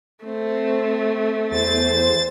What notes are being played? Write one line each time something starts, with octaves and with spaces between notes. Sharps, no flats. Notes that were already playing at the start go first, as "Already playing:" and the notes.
A3 C4
E2 C5 A6